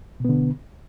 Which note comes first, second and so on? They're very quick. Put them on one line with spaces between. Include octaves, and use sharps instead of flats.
B2 B3 D3